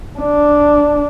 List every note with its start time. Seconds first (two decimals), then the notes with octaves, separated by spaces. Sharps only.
0.20 D4